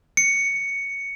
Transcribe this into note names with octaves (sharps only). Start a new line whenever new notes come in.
C#7